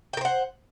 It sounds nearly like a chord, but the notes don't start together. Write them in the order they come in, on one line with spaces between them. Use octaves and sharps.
G5 A#4 C5 F#5